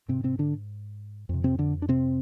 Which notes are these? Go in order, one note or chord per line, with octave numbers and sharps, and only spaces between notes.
G#2 C3 C4
C3 C4
D3 D4
F2 C3
C3 C4
D3 D4
D4
C3 C4